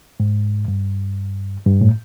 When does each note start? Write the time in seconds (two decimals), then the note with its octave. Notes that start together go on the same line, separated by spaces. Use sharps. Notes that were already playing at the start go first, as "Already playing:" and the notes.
0.20 G#2
0.68 G2
1.66 G2
1.81 A2